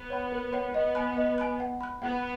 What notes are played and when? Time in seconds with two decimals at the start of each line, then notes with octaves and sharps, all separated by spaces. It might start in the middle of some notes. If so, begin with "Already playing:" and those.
Already playing: B3
0.10 C#5 F#5 B5
0.32 A#4
0.52 C#5 F#5 B5
0.74 B3 D#5
0.95 G#5 B5 F#6
1.17 D#5
1.38 G#5 B5 F#6
1.60 F#5
1.81 B5 F#6
2.02 B3 F#5